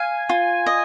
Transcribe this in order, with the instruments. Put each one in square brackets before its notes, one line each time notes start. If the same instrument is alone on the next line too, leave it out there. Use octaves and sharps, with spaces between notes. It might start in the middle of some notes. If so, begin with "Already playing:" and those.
Already playing: [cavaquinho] F5 [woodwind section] G#5
[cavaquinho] F4
D#5